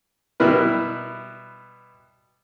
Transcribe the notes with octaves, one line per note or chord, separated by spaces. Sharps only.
B2 G3 E4 A#4 B4